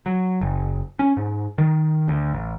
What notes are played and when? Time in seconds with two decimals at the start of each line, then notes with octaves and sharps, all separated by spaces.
0.06 F#3
0.41 F#1
0.99 C#4
1.17 G#2
1.58 D#3
2.08 D2
2.33 A1